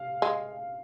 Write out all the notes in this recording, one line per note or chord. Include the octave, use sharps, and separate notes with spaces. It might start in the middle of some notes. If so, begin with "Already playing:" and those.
Already playing: F5
G#3